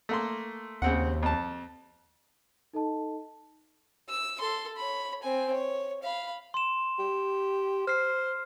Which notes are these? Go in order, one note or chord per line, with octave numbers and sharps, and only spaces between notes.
A3 A#3 C6
D#2 C#3 C4 F#5
F2 A5
D#4 A4 D#5 A5
E6
A4 C6
C#5 B5
C4 G#5
C#5
F5 B5
C6 E7
G4
C5 F6 C7